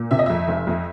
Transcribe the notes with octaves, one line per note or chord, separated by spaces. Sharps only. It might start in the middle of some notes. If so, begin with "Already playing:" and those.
Already playing: A#2
C3 E5
D#5
F2 E5
F1
F2